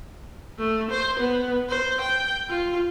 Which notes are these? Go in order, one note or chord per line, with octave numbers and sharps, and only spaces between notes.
A3
C5
B3
C5
G5
F4